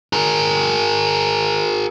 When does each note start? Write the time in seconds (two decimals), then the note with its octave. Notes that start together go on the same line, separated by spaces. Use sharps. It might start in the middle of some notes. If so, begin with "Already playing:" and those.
0.13 G#4 A#4